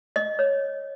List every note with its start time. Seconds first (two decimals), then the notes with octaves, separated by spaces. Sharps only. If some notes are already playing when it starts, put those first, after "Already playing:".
0.16 D#5
0.39 C#5